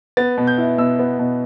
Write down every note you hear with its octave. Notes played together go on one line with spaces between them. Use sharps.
B3 A6
B2
G6
E4
B2 E6
B3
B2